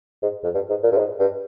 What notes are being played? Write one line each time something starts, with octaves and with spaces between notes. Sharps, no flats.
G#2
F2
G2
G#2
A#2
G2
G#2
G2